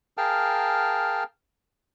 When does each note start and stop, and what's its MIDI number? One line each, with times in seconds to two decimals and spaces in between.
0.18 1.24 68
0.18 1.24 70
0.18 1.24 77
0.18 1.24 79
0.18 1.24 81
0.18 1.24 89